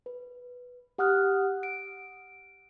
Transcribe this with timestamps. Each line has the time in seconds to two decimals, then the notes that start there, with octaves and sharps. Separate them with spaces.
0.06 B4
0.98 G4 F#5 D#6 F6 F#6
1.63 D7